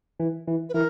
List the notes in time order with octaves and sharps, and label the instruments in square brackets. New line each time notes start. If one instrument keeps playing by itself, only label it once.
[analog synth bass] E3
E3
[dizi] B4
[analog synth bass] E3 [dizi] A#4